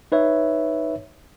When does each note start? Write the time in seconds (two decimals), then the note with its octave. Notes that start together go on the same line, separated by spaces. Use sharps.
0.12 D#4 B4 C#5 E5